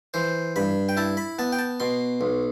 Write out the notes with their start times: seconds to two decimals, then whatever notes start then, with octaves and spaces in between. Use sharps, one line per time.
0.14 E3 C5
0.56 G2 B5
0.89 G5
0.97 E4 A5
1.17 B5
1.39 B3 A5
1.52 G5
1.59 A5
1.80 B2 C6
2.21 B1